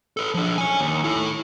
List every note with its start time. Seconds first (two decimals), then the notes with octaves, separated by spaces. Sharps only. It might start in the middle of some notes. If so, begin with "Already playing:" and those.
0.17 A4 B4
0.34 F3 D4
0.58 C#5 G#5
0.79 D#2
1.04 E4 A4